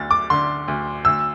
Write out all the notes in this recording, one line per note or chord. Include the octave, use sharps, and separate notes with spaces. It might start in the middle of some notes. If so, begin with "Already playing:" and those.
Already playing: D2 D3 A6
D6
D3 C6
D2
D2 E6